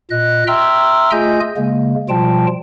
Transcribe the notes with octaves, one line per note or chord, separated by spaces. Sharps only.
A#2 D#5 F#6
E5 G5 A#5 C6 E6 F6
A3 F4 G#4 D#5 G#5 G6
C#3 G#3 A#3
B2 F3 G3 F4 G5 A5